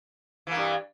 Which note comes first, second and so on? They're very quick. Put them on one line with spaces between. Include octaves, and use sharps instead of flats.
E3 A#3 G2